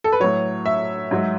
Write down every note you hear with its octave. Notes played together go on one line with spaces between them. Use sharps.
A4
B4
A2 F#3 C#5
E5
G#2 F#3